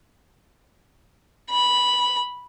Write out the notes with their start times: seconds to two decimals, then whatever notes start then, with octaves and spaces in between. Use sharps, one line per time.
1.50 B5